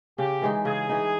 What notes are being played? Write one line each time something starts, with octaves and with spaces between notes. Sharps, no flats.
C#3 G4
E3 G#3 D#4
C#3 G#4
E3 G#3 D#4